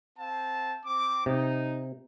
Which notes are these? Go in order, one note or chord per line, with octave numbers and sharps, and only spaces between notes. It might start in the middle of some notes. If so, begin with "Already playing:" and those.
C4 F5 A5
C4 D6
C3 D#4